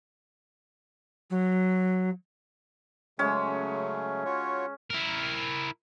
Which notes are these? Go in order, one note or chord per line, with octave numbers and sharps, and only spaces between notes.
F#3
C#3 F#3 G#3 A3 C#4
F4 F#4 C#5
E4 A#4